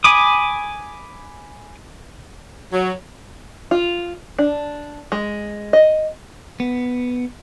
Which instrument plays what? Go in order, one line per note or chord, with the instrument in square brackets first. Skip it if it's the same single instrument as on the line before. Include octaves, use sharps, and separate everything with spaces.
[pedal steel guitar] G#5 B5 D6 D#6
[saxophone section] F#3
[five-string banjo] F4
D4
G#3
D#5
[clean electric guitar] B3